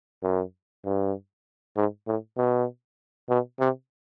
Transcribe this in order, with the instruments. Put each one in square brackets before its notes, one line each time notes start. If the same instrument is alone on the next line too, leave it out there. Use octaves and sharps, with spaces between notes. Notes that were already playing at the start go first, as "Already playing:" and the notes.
[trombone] F#2
G2
G#2
A2
B2
B2
C3